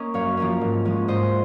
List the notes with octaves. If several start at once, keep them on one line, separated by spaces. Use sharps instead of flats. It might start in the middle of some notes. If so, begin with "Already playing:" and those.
Already playing: A#3 C#4 D#5
F#2 C#5 F5
F3 A#3 C#4
G#2
F3 G#3 C#4
G#2 C5 D#5